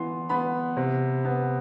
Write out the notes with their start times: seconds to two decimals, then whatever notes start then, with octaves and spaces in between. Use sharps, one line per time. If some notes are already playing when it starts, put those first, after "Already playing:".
Already playing: E3 B3 C6
0.29 B3 B5
0.77 C3
1.25 B3